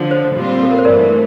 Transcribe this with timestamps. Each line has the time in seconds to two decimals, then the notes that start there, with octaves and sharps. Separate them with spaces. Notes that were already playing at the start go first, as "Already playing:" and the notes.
Already playing: D3 F3
0.11 C5
0.36 A#2 G3 C4 F4
0.63 A4
0.71 A#4
0.78 C5
0.85 G2 E3 A3 A#4 D5
1.10 A#4